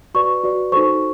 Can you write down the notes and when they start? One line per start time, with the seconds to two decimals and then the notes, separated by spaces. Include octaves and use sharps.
0.14 F#4 B4 D5 C#6
0.43 F#4 B4 D5
0.72 D#4 F#4 A4 C5 C#6